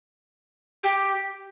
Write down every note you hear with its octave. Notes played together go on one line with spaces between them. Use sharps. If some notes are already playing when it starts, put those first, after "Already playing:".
G4